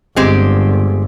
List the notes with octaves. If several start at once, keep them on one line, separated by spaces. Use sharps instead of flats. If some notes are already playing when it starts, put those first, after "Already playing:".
G1 G2 G#3 C4 G4